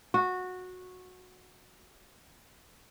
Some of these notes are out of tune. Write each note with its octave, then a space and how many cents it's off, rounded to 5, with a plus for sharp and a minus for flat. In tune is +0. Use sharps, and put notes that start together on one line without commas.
F#4 -15